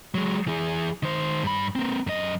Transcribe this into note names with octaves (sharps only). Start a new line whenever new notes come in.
F#3 G#3
E3 G#4
D#3 C5
G2 B5
A#3 C4
F#2 D#5